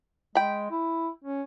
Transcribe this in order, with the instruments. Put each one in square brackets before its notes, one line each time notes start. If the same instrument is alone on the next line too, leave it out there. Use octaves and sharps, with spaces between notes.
[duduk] G#3 [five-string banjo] G5 B5
[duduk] E4
C#4